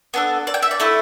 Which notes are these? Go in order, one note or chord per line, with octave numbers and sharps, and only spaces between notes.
B3 D4 A4
D5
G5
E5
D5
A3 E4 A4